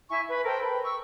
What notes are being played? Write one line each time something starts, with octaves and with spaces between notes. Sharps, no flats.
E4 E5 G#5 C#6
B4
A4 A#4 C5 G5
B4
C#6 E6